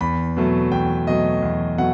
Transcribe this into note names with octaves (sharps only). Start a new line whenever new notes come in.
E2 B5
B2 F#3 A3
E2 G5
B2 F#3 A3 D#5
E2
B2 F#3 A3 F#5